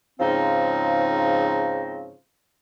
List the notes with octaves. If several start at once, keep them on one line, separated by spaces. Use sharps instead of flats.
G#2 C#3 F3 C4 D#4